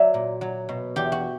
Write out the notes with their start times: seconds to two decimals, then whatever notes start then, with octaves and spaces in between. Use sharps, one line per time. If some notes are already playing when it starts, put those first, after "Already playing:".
Already playing: F#3 D5 E5
0.14 A#2
0.41 F#3
0.69 B2
0.96 E2 G4
1.12 F#4